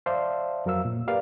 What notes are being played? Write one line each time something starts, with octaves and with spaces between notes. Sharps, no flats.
C5 D5 E5 F5 A5
F2 F#3 A#4 F5 E6
A#2
G4 A#4 B4 D5 F5